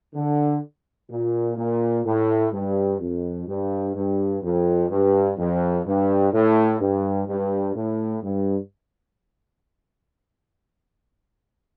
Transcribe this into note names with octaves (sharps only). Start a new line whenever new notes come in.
D3
A#2
A#2
A2
G2
F2
G2
G2
F2
G2
F2
G2
A2
G2
G2
A2
G2